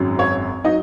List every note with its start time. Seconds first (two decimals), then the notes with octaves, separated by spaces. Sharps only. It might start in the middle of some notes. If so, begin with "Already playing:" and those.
Already playing: G#1 F#2 F#3 C#4
0.19 C#5
0.64 F#3 D#4 D#5